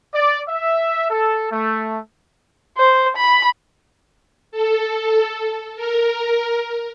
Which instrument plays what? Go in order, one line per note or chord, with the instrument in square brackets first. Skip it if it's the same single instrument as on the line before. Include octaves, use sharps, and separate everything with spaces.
[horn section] D5
E5
A4
A3
[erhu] C5
B5
[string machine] A4
A#4